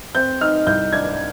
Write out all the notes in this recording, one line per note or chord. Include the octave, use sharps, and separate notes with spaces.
C4 G6
D#4 F6
C2 G6
D4 G#6